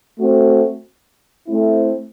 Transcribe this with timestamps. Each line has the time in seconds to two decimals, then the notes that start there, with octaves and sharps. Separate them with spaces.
0.18 A3 C4 F#4
1.48 A3 C4 E4